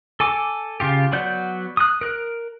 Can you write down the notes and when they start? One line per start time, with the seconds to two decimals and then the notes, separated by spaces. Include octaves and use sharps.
0.20 A4 G#5 D6
0.80 C#3 F4 G4
1.12 F#3 B3 D5 F#5 G6
1.77 D#6 F#6
2.01 A#4 F#6